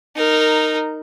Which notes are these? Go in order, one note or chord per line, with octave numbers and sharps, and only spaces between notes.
D#4 A#4